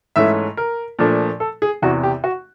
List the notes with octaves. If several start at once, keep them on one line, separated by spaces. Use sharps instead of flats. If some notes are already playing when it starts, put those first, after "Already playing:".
G#2 E3 A3 C#4 E5
A#4
A#2 F3 A3 D4
A4
G#4
E2 C3 E3 F#4
G4
F#4